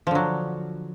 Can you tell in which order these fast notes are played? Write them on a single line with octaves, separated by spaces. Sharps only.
F3 D3 F#3